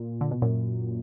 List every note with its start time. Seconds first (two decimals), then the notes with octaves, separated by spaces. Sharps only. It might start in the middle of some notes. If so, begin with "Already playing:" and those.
Already playing: A#2
0.21 D3
0.31 B2
0.42 F#2 A#2